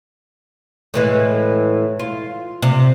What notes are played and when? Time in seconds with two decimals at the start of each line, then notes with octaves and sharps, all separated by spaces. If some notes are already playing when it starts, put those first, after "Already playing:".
0.94 A2 E3 G#3
1.99 F4
2.62 C3